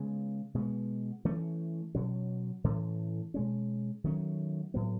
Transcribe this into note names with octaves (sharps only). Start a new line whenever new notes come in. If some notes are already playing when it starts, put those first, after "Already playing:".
Already playing: C#3 G#3 B3
B2 G#3 B3
E3 A3 C#4
B2 F#3 C#4
A2 E3 A3 C#4
B2 G#3 C#4
D#3 F#3 A3 C#4
A2 F#3 B3